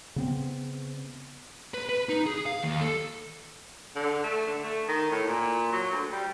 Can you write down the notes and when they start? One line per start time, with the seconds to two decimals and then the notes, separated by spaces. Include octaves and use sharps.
0.16 C#3 B3 C4
1.74 B4
1.89 B4
2.09 D#4
2.26 G#4
2.46 F5
2.63 D#2
2.81 A4
3.96 D3
4.24 A3
4.47 D3
4.64 A3
4.88 D#3
5.11 A2
5.27 A#2
5.72 F#3
5.92 D2
6.12 G3